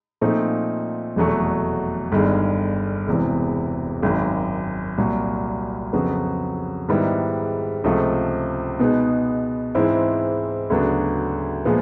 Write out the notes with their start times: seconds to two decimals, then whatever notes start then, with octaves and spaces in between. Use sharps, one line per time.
0.21 A#2 F3 A3 C4 D#4
1.16 F1 E2 B2 F#3 A3
2.12 G1 G2 D#3 G#3
3.07 E1 E2 C3 E3
4.03 G#1 F#2 D#3
4.98 C2 A#2 F#3
5.93 F2 C#3 F#3 B3
6.89 G#2 D#3 G3 B3 E4
7.84 C#2 C3 F3 A3
8.79 B2 G#3 B3 D#4
9.75 G#2 E3 G#3 C4 E4
10.70 D2 C#3 F#3 B3 D4
11.65 A#2 F3 G#3 B3